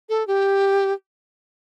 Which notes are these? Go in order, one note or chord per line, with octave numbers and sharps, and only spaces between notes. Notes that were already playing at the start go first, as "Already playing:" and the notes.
A4
G4